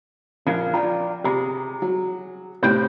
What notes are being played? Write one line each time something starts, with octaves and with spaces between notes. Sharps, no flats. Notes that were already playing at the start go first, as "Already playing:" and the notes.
A#1 C#4 A#4 F5
F4 D5 G5 A#5
C3 G#4 A#5
F#3
A2 C3 B4 C5 G5